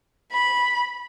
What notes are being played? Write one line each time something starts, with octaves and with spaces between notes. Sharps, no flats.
B5